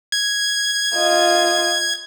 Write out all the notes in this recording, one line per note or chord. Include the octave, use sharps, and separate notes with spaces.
G#6
F4 D#5